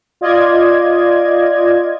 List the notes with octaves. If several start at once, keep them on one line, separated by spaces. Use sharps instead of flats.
F4 D5 D#5 G#6